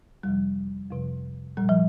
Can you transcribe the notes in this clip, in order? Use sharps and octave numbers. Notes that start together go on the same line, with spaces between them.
F2 C3 F3 G3
F2 C3 F3
A#2 F3 G3
F3